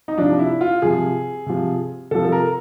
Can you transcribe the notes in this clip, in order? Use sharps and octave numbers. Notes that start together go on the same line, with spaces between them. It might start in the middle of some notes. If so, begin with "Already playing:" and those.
D#4
C3 F3 D4
E4
F4
C3 F3 G#4
C3 F3
C3 F3 A4
A4
A#4